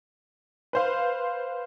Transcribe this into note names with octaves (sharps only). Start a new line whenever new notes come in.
B4 C5 F5